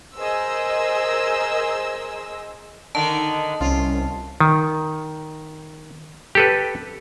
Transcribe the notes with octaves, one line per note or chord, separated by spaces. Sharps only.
G#4 A#4 C5 D#5 E6
D3 D#3 D#4 A5
C2 C#4 F4
D#3
G4 A4 B4